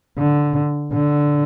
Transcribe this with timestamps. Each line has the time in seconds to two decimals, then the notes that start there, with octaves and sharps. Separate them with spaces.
0.18 D3
0.94 D3